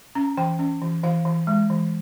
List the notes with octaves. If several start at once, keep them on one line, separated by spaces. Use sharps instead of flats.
C#4 A#5
E3 G5
C#4
E3
E3 F5
E3
G#3
E3